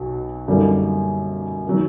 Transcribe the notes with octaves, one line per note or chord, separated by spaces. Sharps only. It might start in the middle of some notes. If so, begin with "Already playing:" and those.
Already playing: B1 B2
F#2 D3 G3 A#3 D#4
D#3 F#3